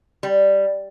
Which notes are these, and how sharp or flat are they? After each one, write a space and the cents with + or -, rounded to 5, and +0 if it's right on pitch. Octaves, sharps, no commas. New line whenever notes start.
G3 +0